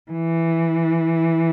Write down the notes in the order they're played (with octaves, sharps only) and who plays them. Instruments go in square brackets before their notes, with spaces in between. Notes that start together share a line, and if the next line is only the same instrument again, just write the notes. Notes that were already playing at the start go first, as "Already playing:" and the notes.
[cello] E3